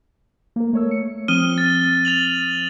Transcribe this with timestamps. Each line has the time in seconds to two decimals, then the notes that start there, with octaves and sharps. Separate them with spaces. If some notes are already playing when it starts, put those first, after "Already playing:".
0.56 A#3 A#4
0.73 A3 C#5 E6
0.91 C#7
1.28 F3 C4 D#6 F6 D#7 G7
1.58 A6
2.05 A6 F7 F#7